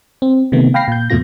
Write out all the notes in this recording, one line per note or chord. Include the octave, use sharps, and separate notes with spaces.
C4
C3 D#3 A3 B3
F5 G5 B5 F6 A#6 C7
A#2 G6
E2 G#2 B2 A3 F4 A#6